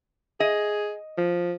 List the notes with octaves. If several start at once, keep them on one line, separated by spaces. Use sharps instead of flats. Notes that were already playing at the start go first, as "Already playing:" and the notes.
G#4 D#5
F3